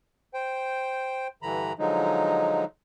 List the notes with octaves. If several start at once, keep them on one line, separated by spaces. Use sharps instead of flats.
C5 G5
G2 D3 E3 A#5 B5
D3 F3 F#3 G#3 D#4